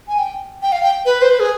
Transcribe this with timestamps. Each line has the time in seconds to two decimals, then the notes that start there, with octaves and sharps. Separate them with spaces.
0.08 G#5
0.18 G5
0.62 G5
0.72 F5
0.83 G5
1.06 B4
1.22 C5
1.31 B4
1.40 G#4